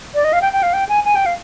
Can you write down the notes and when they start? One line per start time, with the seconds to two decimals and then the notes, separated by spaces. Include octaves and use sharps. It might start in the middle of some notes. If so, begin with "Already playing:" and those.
0.15 D5
0.24 D#5
0.33 F5
0.42 G5
0.53 G5
0.63 F5
0.73 G5
0.89 G#5
1.05 G#5
1.15 G5
1.26 F5